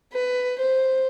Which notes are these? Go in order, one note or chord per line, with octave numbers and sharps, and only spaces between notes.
B4
C5